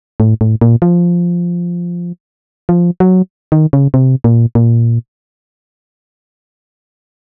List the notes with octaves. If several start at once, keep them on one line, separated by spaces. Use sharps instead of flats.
A2
A2
A#2
F3
F3
F#3
D#3
C#3
C3
A#2
A#2